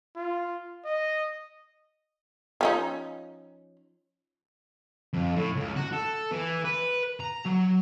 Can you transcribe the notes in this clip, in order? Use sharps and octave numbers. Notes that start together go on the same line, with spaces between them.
F4
D#5
F3 C#4 D#4
F2
A2
C#2
F#4
A4
E3
B4
A#5
F#3